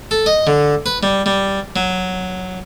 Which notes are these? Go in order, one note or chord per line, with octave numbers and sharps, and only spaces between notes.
A4
D#5
D3
B4
G3
G3
F#3